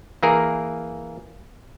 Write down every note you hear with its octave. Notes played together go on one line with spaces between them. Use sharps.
E3 A#3 G#4 A#4